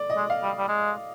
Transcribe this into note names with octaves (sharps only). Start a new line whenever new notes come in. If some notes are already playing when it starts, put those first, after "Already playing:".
Already playing: D5
D#5
G#3
F5
G3
G3
G#3